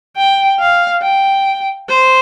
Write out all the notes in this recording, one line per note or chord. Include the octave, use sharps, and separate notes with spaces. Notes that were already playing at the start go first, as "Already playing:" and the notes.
G5
F5
G5
C5